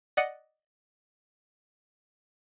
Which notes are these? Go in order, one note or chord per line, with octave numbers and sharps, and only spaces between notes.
D5 D#5 F#5 C#7